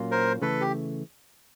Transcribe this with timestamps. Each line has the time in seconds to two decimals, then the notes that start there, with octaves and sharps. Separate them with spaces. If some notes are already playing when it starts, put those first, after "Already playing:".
Already playing: A#2 F#3 A#3 C#4 F4
0.11 A#4 C5
0.42 C#3 E3 A3 A4 B4
0.61 G4